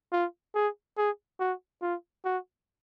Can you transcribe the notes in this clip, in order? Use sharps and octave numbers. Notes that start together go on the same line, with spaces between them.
F4
G#4
G#4
F#4
F4
F#4